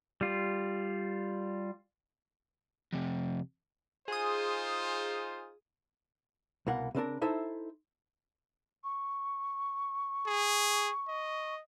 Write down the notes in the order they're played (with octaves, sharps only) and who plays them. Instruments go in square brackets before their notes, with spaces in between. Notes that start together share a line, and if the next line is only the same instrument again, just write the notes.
[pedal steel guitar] G3 F4
[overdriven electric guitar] F2 C3
[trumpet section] D#4 F4 C5 [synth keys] G#4 D#6
[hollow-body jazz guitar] C2 B2 A#3 F#5
C#3 C4 D4 A#4
D#4 E4 A4 C5 E5
[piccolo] C#6
[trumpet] G#4
D#5